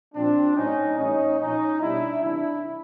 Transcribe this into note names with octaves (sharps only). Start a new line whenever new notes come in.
A#2 F3 C4 D4
A2 F#3 C#4 D#4
A2 E3 G3 C#4 D#4
A#2 F3 C#4 D#4
B2 G3 D4 E4
C3 E3 G3 D4 E4